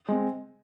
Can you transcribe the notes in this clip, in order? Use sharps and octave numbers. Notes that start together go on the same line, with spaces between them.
G#3 C4